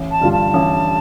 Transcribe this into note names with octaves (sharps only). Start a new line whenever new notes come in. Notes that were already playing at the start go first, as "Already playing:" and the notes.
Already playing: A1
A5
G2 D3 G3 F4
A5
A1